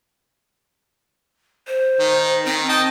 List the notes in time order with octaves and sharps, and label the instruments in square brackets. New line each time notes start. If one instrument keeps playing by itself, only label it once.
[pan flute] C5
[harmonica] D#3
[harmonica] D#3 [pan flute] C4
[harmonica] D#5 G5 A5